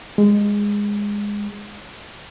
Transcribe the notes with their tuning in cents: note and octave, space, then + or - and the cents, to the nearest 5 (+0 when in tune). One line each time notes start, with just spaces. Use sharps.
G#3 -15